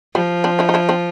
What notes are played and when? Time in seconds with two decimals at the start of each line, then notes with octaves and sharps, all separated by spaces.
0.14 F3 G3
0.44 C4 D4
0.59 D4 E4
0.69 D#4
0.74 D4 E4
0.89 C4 D4